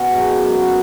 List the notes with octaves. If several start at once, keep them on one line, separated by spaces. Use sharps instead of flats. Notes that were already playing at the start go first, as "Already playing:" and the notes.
Already playing: B2 C#4 F#4 B4
G#2 F#3
F#2 F#3
B3